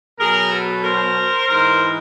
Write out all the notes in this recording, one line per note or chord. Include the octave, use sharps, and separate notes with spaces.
B2 F#3 G#4 A#4
A4 B4
A#4 C5
G#2 E3 A#4 C5